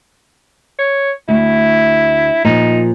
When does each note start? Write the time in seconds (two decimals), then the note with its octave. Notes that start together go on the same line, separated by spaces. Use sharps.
0.79 C#5
1.29 D2 E4
2.45 A#2 F3 D#4